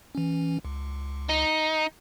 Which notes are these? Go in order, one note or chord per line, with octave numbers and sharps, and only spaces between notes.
E3 C#4
C#2
D#4